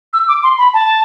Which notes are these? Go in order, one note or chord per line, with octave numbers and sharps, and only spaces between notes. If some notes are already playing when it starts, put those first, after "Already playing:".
E6
D6
C6
B5
A5